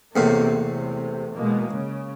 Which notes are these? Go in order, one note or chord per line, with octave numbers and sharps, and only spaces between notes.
E2 A2 C3 A#3
C3
B2 G#3 A#3
C#3